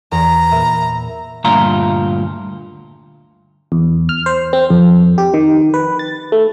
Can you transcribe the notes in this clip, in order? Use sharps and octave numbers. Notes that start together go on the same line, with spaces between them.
E2 A#5
A#2 E5 B5
D2 G2 A#2 F4 A#5
E2
F6
C5
C4
F2
G4
D#3
B4
A6
A3